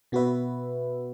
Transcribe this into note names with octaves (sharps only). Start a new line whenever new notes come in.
B2 B3 F#4 B4 E5